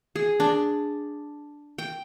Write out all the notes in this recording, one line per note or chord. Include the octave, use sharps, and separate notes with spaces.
G#4
D4
G5